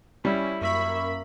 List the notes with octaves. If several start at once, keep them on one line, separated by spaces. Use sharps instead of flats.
G3 C#4 E4
F#2 A#3 E5 B5 C#6